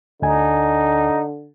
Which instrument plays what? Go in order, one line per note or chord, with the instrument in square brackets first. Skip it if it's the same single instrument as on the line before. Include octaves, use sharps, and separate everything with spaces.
[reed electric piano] D2 G#5 [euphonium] D3 [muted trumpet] D#4